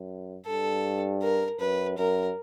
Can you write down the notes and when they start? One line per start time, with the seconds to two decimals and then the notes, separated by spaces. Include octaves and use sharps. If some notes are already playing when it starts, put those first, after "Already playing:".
Already playing: F#2
0.46 G2 A4
1.22 A#4
1.60 F#2 B4
1.98 F#2 A#4